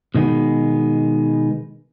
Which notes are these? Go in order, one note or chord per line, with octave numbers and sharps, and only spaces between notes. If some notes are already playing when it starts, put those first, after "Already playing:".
B2 D#3 G#3 B3